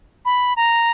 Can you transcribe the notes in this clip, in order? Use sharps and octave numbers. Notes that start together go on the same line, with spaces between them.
B5
A#5